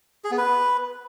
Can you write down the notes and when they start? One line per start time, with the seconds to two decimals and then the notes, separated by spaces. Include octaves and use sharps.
0.24 G#4
0.31 B3
0.38 B4